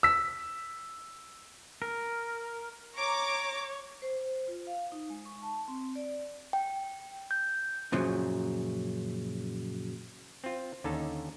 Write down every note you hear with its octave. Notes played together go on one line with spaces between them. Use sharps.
E6 B6
A#4
C#5 A#5 D6
C5
C5
F4
F5
D#4
G#3
C#6
A5
C4
D5
G5
G6
F#2 A#2 C#3 F3 F#3
C4 F4
D#2 D3 C#4 D#4 A4 A5